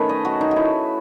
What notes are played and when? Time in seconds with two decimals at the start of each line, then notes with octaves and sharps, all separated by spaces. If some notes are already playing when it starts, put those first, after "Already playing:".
Already playing: D#3 A3 C#4 B4 C#5
0.09 D#5
0.25 F#4
0.41 D#4
0.51 F#4
0.56 E4